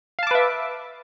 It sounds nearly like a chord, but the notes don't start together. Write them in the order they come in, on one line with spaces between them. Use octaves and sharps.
F5 A5 D6 B4 E5